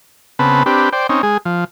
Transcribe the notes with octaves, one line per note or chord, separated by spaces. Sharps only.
C#3 B3 C4 B4 A5
C4 D4 G4 B4
C5 D5 G5
C4 C#4 D#4
G#3 G#4
F3